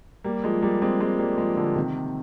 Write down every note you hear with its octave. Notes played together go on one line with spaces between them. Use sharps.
G3 A#3
F3 G#3
G3 A#3
G#3 C4
G#3 C4
G3 A#3
F3 G#3
D3 F3
C3 D#3